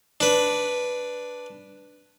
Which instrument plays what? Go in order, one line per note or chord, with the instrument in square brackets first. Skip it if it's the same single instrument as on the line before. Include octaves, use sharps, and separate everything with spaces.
[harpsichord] D4 B4